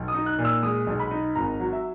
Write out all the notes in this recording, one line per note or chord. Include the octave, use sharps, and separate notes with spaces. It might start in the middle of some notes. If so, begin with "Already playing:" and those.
Already playing: B1
D#6
D#4
F#6
A#2
E6
G#3 D#6
B1
B5
D#4
G#1 A#5
F#3
E5